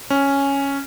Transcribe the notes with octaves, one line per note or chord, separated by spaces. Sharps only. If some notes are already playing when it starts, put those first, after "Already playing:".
C#4